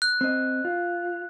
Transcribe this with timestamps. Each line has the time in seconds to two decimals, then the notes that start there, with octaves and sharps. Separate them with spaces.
0.02 F#6
0.21 C4 D#5
0.65 F4